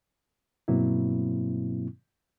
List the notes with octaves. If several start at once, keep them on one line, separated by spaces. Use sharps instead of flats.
G2 B2 F#3 A#3 C4 E4